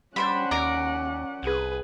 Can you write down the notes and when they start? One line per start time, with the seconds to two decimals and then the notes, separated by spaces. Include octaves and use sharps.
0.16 G3 C#4 D4 C5 F#5 B5
0.51 D#2 A#4 D5 A#5
1.43 C2 G#4 B4